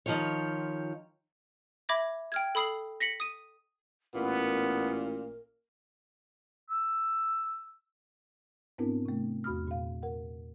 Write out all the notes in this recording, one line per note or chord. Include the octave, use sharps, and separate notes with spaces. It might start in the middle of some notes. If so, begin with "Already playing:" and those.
D#3 F3 F4 G4 C#5
E5 B5 D6 G#6 A#6
G5 F6 G#6
A4 B5 D#6 C7 F#7
A#6 B6 C#7 F#7
D#6 D#7
A1 A#2 B3 A#4
E6
G#2 B3 C4 D4 E4 A#4
C3 A3
E2 F#4 B5 D#6 F6
A#2 F5
A#4 F#5